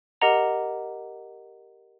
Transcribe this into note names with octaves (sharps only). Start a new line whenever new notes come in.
G4 A#4 D#5 F#5 A#5